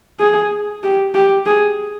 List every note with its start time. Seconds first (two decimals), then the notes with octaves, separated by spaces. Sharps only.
0.20 G#4
0.83 G4
1.14 G4
1.46 G#4